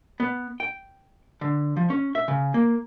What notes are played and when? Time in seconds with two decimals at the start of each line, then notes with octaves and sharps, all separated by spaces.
0.20 B3
0.60 G5
1.41 D3
1.76 F3
1.90 C#4
2.15 E5
2.28 C#3
2.54 A#3